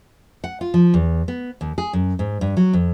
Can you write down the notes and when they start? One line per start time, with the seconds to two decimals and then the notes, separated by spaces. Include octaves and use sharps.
0.44 F#5
0.61 F4
0.74 F3
0.94 E2
1.28 B3
1.61 D#2
1.78 G#4
1.93 F#2
2.19 G#2
2.41 G2
2.57 F#3
2.73 F2